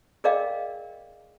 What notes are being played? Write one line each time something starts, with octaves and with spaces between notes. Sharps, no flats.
G#4 A#4 D5 D#5 F5 G5